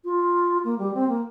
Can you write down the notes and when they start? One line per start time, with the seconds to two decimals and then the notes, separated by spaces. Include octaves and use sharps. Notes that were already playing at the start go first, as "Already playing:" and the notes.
0.04 F4
0.64 A#3
0.78 G3
0.93 C4
1.08 A#3